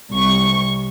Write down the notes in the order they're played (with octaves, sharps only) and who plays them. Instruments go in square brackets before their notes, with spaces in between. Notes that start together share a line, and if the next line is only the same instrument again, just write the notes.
[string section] C2 C#6